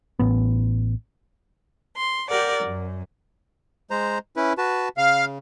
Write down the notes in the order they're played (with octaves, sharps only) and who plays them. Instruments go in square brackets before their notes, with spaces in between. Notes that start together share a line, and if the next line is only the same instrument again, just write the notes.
[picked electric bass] A1 B3
[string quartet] C6
G4 A#4 D5 F#5
F#2
[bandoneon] G#3 C5 A#5
C#4 E4 B4
F#4 B4 A5
[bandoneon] C#3 [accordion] F5